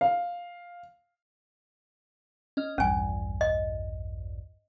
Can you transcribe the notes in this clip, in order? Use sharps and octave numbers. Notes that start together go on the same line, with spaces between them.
F5
C#4 D#5 F6
A#1 E2 G2 C#4 G#5
D#5